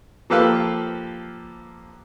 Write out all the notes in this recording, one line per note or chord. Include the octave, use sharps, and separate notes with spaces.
F3 A#3 G4 A4 B4 F5